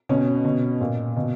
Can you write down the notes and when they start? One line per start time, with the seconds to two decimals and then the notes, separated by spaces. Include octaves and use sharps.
0.09 B2 C#4
0.45 B2
0.81 A#2
1.16 B2